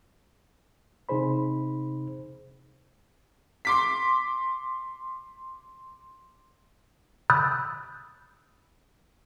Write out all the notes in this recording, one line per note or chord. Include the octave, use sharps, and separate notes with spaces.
C3 D#4 G#4 C5 B5
C6 D6 B6
B5 D#6 E6 F#6 G6 A6